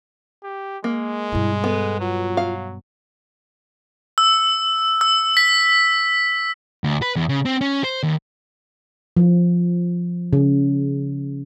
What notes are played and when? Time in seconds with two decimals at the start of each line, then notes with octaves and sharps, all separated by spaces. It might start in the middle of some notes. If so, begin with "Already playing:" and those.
0.43 G4
0.84 G#3 A#3
1.32 G2 B2 E4
1.64 B3 A4
2.00 F#3 F4
2.37 F5
4.18 E6
5.01 E6
5.37 B6
6.84 D2
7.02 B4
7.16 E2
7.29 C#3
7.45 C4
7.61 C#4
7.84 C5
8.03 D#2
9.17 F3
10.33 C#3